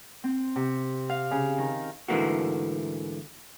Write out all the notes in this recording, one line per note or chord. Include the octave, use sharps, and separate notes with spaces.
C4
C3
F5
C#3
D#3
G#2 D3 E3 A3 A#3 F#4